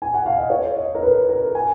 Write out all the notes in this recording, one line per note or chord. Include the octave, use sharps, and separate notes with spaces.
G#5
F#5
F5
D#5
C#5
D#5
A#4
B4
A#4
G#5